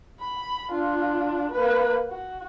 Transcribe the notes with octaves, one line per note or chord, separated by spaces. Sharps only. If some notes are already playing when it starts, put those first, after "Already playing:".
B5
D4 F4
A#3 B4
F#4